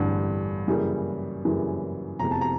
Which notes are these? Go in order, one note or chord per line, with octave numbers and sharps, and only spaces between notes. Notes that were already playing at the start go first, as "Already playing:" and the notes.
Already playing: A1 G2 D3 G3
F#2 C#3 E3 G3 A#3
F#2 C#3 E3 G3 A#3
F1 E2 C3 A#5
A5
A#5